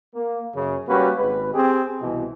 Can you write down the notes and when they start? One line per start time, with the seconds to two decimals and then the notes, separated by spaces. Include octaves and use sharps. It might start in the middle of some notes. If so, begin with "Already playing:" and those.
0.15 A#3
0.56 F#2 C#3
0.88 G3 A#3 C#4 F#4 B4
1.18 G#1 G#3 B4
1.54 C4 G4 G#4
2.01 C2 B2 E3